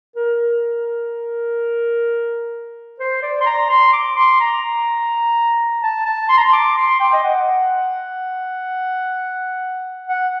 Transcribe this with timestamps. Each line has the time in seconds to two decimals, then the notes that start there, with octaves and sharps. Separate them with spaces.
0.16 A#4
2.99 C5
3.23 D5
3.41 C6
3.46 A#5
3.70 C6
3.93 D6
4.16 C6
4.40 A#5
5.83 A5
6.06 A5
6.29 C6
6.37 A#5
6.44 C6
6.53 D6
6.77 C6
7.00 G5
7.13 D#5
7.24 F#5
10.07 F#5